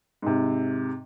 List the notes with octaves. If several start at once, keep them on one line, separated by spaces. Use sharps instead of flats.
G#2 C3